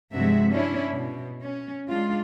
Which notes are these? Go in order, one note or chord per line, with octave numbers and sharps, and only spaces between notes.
G2 C3 F3 G#3 F#4 E5
C#4 D4 E4
B2
C#4
G#3 D4 F4